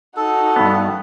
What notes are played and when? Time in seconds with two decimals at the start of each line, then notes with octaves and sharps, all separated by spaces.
0.17 D#4 F#4 A4
0.56 G2 B3